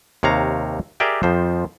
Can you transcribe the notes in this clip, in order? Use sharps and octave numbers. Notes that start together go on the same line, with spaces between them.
D#2 C3 C#5 F5 A#5
G4 G#4 A#4 D5 E5 G5
F2 F3 C5